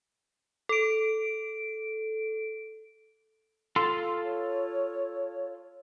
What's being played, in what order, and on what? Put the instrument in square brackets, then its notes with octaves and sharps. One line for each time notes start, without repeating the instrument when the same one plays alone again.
[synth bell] A4 D7
[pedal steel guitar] F4 A4 C6
[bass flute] C#5